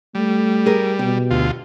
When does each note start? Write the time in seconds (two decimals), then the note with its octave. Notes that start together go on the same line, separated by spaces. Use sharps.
0.15 G3 A3
0.66 G#4 A#4
0.99 B2 G4
1.30 D2 F4